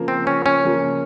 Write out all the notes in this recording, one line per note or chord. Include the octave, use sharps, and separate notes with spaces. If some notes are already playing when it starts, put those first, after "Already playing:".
Already playing: C#3 F3 A#3 F4 A#4
C4
C#4
C#4
C#3 F3 A#3 F4 A#4